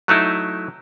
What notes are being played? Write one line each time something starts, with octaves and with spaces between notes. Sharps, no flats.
F#3 A3 D#4 E4